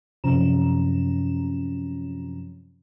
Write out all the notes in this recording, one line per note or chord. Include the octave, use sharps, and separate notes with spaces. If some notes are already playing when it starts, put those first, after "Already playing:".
F#2 C3 F3 C#4 A#5 E7